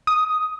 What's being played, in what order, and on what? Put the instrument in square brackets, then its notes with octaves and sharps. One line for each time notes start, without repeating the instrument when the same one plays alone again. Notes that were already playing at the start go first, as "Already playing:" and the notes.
[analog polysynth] D#6